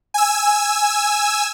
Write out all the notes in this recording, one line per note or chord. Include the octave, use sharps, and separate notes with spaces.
G#5 E6